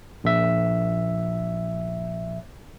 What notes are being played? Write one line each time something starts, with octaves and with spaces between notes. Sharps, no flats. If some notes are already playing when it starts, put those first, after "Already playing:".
A#1 E5